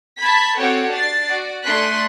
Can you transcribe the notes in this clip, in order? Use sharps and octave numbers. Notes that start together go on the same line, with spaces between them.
A5 B5 G#6 B6
C4 F#4 G4 A4 C#5
D4 A6 C7
F#4 D5
A3 D4 G#5 C6 F#6 B6